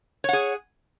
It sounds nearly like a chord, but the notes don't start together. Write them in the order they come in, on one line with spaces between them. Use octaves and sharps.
C#5 F#5 G#4